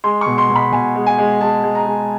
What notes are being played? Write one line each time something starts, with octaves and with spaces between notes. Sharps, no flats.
G#3 C6
B2 C#6
C6
B2
B5
B2 G#5
G#3
G#5
G#3
G#3 A5
G#3
A#5
G#3